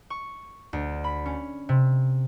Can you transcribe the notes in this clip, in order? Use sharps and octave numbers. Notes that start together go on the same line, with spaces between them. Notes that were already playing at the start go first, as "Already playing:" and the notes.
C#6
D2
B5
C#4
C3